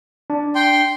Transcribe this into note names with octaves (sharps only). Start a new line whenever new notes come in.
D4
G5 C6